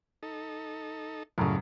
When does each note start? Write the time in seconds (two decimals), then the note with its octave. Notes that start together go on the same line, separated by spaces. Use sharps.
0.23 D#4 A4
1.38 F#2 A2 C#3 F4 D5